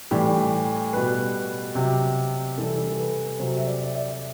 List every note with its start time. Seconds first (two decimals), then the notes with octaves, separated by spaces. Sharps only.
0.11 A2 E3 G3 G4
0.93 B2 G3 B4
1.75 C3 F#3 G4
2.58 C3 E3 G3 A4
2.92 A4
2.99 B4
3.39 C3 F#3 C5
3.57 E5
3.67 D5
3.84 D5
3.94 E5